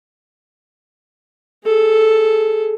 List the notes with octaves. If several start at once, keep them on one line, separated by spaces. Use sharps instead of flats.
G#4 A4